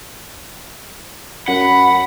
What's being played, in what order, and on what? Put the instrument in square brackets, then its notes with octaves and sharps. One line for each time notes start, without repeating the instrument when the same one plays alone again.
[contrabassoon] F#2 [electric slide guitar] F#5 [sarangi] B5